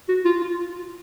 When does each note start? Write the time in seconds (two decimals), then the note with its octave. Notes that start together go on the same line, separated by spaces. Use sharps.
0.09 F#4
0.25 F4
0.41 F4